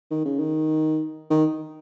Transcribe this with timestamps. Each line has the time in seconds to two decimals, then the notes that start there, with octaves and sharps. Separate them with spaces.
0.11 D#3
0.25 C#3
0.39 D#3
1.30 D#3